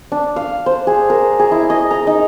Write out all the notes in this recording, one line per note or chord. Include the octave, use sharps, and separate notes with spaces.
D4
F5
C5
G#4
A#4
G#4
E4
D#5
A#5
D#4